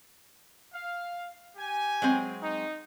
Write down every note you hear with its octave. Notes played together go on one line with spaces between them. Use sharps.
F5
G4 G#5
F#3 G#3 C4
D#4